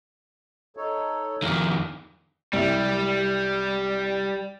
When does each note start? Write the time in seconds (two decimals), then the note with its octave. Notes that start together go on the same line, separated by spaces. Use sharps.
0.77 D#4 A4 C#5
1.43 F2 D#3 A#4
2.53 C2 G3 E5